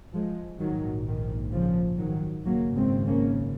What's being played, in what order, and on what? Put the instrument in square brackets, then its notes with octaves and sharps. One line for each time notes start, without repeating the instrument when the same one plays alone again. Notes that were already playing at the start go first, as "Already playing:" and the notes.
[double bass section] F3 G#3
A#1 G#2 D#3 F#3
D#3
C#3 F3
D#3 F#3
G#1 F#2 C#3 F#3 A#3
G#3 C4
A#3 C#4